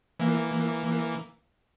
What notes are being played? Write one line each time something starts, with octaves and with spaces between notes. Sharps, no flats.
E3 A#3